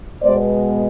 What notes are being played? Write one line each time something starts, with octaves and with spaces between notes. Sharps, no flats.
B2 G#3 B3 C5 D5